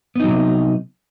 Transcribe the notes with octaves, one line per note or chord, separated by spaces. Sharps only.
C3 F#3 B3 D#4